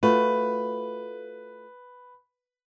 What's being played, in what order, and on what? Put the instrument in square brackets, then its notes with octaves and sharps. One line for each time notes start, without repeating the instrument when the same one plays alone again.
[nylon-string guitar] A3 F4 F#4 [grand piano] B4